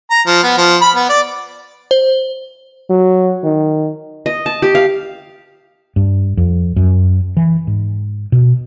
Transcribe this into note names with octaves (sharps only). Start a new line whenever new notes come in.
A#5
F3
B3
F3
B5
B3
D5
C5
F#3
D#3
D#5
A5
G4
F5
G2
F2
F#2
E3
G#2
B2